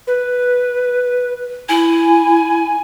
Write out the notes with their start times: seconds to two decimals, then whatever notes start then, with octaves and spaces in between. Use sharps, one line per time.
0.07 B4
1.69 E4 G#5